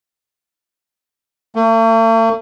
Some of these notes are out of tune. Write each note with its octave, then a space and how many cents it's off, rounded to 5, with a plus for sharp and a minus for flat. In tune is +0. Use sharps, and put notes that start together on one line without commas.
A3 +45